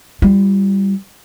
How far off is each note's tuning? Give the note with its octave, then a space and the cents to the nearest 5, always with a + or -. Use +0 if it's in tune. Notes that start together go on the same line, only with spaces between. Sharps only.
G3 +0 F4 -35